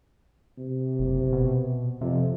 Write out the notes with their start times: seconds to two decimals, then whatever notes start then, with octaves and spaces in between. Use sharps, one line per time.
0.58 C3
0.99 F#1
1.32 B2
2.01 F2 C3